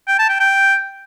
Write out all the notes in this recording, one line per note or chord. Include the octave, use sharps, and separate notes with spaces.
G5
A5
G5
G5